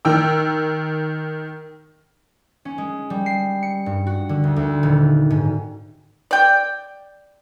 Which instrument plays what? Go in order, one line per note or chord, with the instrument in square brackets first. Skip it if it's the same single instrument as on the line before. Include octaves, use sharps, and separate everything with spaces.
[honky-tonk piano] D#3 G5 E6
[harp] C#4
G#3
G3
C7
C#7
G2
F#4
D3
D2
D2
D#1
G#2
[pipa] D5 G5